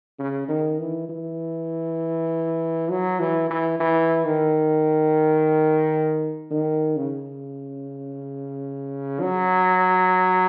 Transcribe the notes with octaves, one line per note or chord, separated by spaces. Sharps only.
C#3
D#3
E3
E3
F#3
E3
E3
E3
D#3
D#3
C#3
F#3